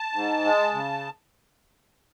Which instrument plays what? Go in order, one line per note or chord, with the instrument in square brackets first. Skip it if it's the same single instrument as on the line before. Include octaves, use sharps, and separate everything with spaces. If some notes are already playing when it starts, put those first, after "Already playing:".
Already playing: [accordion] A5
G#2
G#3
C#3